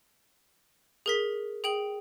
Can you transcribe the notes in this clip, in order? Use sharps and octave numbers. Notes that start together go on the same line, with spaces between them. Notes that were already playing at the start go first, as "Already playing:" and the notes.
G#4 A#4 B6
G#4 G5 F#7